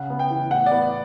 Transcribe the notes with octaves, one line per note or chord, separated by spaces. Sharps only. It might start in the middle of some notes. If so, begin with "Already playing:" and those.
Already playing: C#3 F#5
B3
G5
E3
A2 F#5
D5
B3